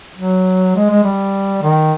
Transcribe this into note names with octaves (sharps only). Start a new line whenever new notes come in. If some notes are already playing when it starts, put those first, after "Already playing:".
F#3
G#3
G#3
G3
D#3